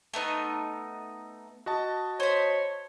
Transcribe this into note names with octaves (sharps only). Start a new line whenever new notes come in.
A3 B3 D#4
F#4 D#5 A5
C5 C#5 B5